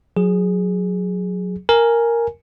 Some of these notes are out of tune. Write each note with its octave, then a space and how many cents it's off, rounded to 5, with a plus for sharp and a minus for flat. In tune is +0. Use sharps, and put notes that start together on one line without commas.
F#3 -20 G#4 +0
A#4 +0 G#5 +0